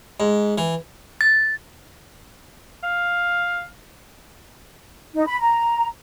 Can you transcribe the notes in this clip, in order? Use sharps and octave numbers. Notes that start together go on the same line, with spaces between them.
G#2
E3
A6
F5
D#4
B5
A#5